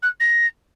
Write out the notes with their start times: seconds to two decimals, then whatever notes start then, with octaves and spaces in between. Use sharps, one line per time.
0.03 F#6
0.20 A#6